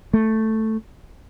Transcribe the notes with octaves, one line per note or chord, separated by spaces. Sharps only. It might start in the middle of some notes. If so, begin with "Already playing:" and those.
A3